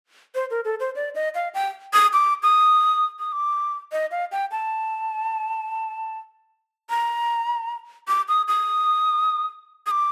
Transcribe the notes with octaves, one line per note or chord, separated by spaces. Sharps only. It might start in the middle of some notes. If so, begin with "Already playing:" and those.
C5
A#4
A4
C5
D5
D#5
F5
G5
D#6
D6
D#6
D#6
D6
D#5
F5
G5
A5
A#5
D6
D#6
D#6
D#6
D6